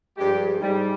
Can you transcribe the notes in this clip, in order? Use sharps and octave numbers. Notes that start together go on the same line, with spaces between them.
G2 F3 G#3 G4
G#2 G3